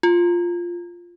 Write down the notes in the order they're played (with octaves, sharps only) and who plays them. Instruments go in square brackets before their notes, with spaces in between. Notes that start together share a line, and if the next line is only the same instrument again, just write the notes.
[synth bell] F4